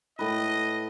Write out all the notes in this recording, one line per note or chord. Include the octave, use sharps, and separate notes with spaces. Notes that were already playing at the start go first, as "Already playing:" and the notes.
A2 B4 D#5